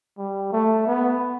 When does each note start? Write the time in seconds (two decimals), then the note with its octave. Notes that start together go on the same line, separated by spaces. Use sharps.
0.18 G3
0.52 A3
0.87 B3